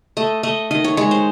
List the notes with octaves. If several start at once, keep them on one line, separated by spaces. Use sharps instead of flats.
A3 D#5
A3 D#5
D#3 D#5
C#5
G#3 C#5
C5